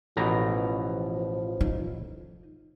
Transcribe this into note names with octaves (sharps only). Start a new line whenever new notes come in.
A1 B2 F3 A#5
D#4